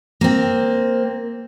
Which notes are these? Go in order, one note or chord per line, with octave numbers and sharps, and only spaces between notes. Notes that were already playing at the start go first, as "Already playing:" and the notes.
A#3 C4